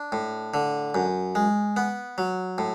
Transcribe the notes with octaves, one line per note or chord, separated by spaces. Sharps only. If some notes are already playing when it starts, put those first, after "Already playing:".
Already playing: D4
A2
D3
F#2
G#3
B3
F#3
A2